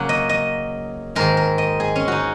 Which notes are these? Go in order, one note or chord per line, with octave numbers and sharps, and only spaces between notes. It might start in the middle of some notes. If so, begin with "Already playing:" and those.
Already playing: C#3 F#3 A#3 F#5
D#5
D#5
G#2 D#3 G#3 A#4
A#4
D#5
G#4
C#4
D#4 F#4